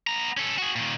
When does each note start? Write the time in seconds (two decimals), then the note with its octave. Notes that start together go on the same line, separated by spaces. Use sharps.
0.07 B3 A#5
0.37 C#4 A4
0.58 F#4 G#4
0.76 A#2 D#3